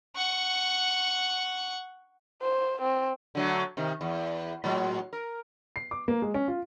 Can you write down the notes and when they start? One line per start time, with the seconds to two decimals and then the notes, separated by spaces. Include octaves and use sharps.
0.16 F#5 C#6
2.42 C5
2.82 C4
3.35 D3 F#3 A3
3.77 C3 D#3
4.01 E2
4.64 A2 F#3 G#3
5.13 A#4
5.76 C7
5.91 D6
6.08 A#3
6.22 G#3
6.34 C#4
6.48 F4